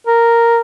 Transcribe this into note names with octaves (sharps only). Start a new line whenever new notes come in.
A#4